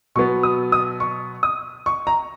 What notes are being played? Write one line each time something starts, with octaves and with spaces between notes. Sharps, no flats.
B2 F#3 B3 C#6
D#6
D#6
C#6
D#6
C#6
A#5